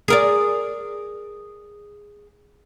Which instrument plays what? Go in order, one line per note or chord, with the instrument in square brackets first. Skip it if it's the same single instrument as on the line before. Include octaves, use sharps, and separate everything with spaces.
[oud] G#4 A#4 D5